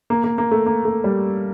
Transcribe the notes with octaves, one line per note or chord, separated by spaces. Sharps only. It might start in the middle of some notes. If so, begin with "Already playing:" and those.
A#3
A#3
A#3
A3
A#3
A3
G3